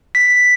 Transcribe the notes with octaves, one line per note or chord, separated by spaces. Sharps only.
B6